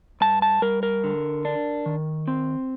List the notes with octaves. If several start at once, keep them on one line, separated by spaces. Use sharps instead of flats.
G2 A5
A5
G3 A#4
A#4
D3
D4
D#3
C4